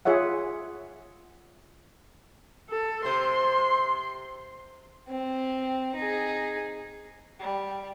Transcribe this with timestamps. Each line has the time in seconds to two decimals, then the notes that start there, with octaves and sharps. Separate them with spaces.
0.05 F4 G#4 C#5 E5 F#5
2.70 A4
3.05 C3 C5 C6
5.09 C4
5.96 D#4 G#4
7.39 G3